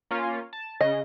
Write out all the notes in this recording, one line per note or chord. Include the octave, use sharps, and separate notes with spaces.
A#3 C#4 F4
A5
C#3 D#5